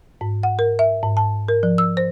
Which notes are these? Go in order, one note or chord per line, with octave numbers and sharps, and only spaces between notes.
G#2
F#5
A#4
E5
G#2
A5
A#4
F3
E6
C5